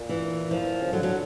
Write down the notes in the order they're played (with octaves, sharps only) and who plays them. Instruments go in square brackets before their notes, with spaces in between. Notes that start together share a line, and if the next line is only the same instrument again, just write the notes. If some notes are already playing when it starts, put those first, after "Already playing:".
Already playing: [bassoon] A#2
[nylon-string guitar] E3
F3
[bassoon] C#3
[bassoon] D3 [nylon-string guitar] F#3
[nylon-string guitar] F#3